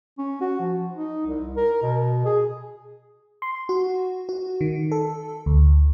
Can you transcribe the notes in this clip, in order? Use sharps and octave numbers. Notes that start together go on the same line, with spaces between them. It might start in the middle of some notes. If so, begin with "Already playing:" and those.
C#4
F#4
F3
D#4
C2
A#4
B2
G#4
C6
F#4
F#4
D#3
A4
D2